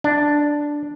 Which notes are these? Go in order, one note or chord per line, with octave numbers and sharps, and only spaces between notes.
D4